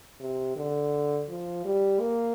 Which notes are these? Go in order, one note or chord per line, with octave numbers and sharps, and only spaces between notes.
C3
D3
F3
G3
A#3